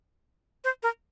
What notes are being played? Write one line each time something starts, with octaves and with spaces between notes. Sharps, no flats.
C5
A#4